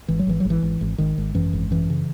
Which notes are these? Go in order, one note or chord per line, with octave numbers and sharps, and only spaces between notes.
G#1 E3
F#3
G#1 E3
F#3
G#1
E3
G#1
G#1
G#1 D#3
G#1
F#2 E3
G#1
F#2 E3
C#3